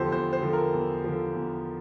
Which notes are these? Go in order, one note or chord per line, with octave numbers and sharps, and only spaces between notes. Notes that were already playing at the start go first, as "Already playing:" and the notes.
Already playing: E2 D3 F3 G4 A4 C5
E2 C5
C5
D3 F3
A#4
E2
D3 F3
E2